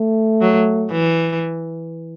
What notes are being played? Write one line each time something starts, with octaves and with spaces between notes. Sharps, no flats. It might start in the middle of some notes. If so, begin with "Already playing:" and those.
Already playing: A3
F#3
E3